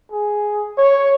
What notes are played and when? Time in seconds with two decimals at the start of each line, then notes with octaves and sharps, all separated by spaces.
0.11 G#4
0.78 C#5